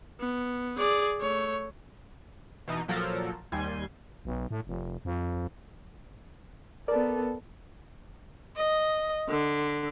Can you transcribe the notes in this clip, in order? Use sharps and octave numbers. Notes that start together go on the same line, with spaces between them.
B3
G#4 D5
A3 C#5
B2 E3 D#4
A#2 F3 F#3 A4 A#4
D#2 G3 G#5 C6 G#6
B1
A2
F1
F2
B3 A4 A#4 D5
D#5
D3